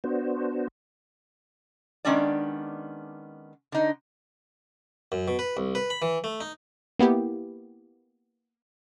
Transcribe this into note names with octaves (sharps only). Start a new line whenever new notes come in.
B3 D4 F#4 C5
D#3 G#3 B3 C#4 D4 D5
D3 D#4
F#2
B2
B4
C2
B4
B5
E3
A3
D#4
A#3 B3 E4 G4